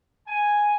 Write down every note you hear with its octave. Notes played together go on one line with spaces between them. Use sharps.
G#5